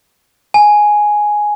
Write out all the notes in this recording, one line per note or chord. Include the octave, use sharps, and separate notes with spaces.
G#5